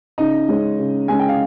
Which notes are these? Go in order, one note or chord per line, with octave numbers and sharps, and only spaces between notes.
C#3 D#4 D#5
G#3 C#4
C#3
G#3 C#4 G#5
G5
F5